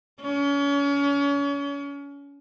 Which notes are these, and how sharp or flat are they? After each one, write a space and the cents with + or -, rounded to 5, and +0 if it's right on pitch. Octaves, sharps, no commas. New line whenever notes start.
C#4 +35